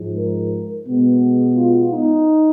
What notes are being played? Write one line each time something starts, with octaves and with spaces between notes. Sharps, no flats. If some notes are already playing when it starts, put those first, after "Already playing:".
Already playing: G#2 F3 G#3
A#4
B2 G#3 B3
F4
D#4